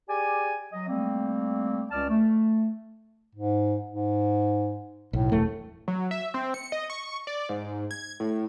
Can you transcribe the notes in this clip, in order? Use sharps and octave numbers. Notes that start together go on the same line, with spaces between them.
G4 G#4 D5 G#5
F#3 D#5
G3 A3 A#3 C4
C#2 C#4 D5 A5 F6
A3
G#2
G#2
B1 A2
E1 A3
F#3
E5
C4
C#7
D#5
C#6
D5
G#2
G#6
A2